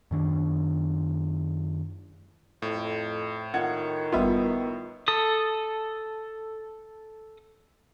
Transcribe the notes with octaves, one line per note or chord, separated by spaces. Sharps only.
F#2 D#3 D4
F2 A2
D#3 F4 F#5 G#6
G1 G3 B3 F4 E5
A4 D#6